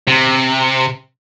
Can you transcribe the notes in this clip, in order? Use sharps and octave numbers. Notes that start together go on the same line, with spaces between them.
C3